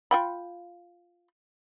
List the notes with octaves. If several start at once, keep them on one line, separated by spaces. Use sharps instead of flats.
F4 G5 B5